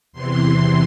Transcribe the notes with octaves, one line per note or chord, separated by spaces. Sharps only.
E2 C3 E3 C6